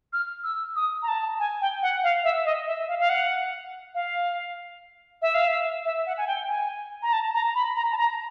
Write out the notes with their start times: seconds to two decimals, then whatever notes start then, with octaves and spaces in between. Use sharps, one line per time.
0.13 F6
0.44 E6
0.76 D#6
1.03 A#5
1.08 A5
1.40 G#5
1.61 G5
1.82 F#5
2.04 F5
2.24 E5
2.45 D#5
2.67 E5
2.88 F5
2.99 F5
3.09 F#5
3.95 F5
5.22 E5
5.34 F5
5.48 E5
5.85 E5
6.06 F#5
6.18 G#5
6.27 G5
6.49 G#5
7.03 A#5
7.13 A5
7.34 A#5
7.55 B5
7.76 A#5
7.92 A5
7.98 A#5